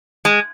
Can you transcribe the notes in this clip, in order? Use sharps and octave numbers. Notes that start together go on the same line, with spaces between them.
G#3